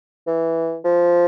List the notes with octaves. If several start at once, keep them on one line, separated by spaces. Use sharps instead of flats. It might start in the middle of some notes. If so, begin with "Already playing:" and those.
E3
F3